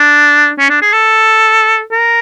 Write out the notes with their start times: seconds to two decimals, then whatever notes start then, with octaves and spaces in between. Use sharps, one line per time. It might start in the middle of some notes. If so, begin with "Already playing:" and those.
Already playing: D4
0.59 C#4
0.70 D4
0.82 G#4
0.93 A4
1.92 A#4